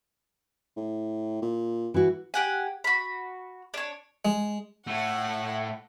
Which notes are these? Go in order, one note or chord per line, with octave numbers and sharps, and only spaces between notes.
A2
A#2
E3 E4 F#4
G4 F#5 G#5
F#4 B5
D4 C#5
G#3
A2 A3 F#5